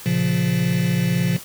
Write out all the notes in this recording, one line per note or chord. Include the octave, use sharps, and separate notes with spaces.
A#2 C#3 F3